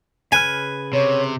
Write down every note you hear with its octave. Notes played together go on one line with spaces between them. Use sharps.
C#3 B4 G#5 F6
C3 C#5